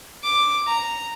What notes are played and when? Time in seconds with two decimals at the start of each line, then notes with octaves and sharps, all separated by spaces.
0.23 D6
0.67 A#5